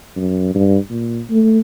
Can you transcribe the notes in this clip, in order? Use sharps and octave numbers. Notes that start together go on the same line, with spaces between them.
F#2
G2
A#2
A3